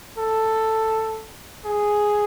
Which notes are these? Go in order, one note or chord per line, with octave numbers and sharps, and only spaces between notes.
A4
G#4